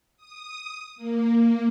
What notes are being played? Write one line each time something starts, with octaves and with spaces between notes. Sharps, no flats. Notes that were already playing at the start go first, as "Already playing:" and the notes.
D#6
A#3